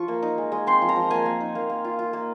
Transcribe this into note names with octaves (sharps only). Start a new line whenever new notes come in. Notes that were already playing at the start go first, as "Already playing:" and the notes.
Already playing: F3 F4 C#6
A#3
D#4
G#3
G#3
C4 C6
F3
A#5
F3
A#3 G#5
A#3
D#4
A#3
A#3
F4
F4
A#3